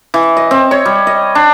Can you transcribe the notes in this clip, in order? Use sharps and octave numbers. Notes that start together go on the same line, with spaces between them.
E3
D#5
C4
C#5
G3
D#5
D4